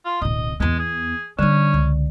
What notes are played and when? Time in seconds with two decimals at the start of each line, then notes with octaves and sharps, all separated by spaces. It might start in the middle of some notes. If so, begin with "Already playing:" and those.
0.05 F4
0.22 D1 B2 D#5
0.60 E2 G#3 B3
0.79 G#4
1.39 D3 G3 C#4 D4
1.74 C#2